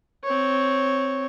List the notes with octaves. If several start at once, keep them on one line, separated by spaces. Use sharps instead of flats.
C4 C#5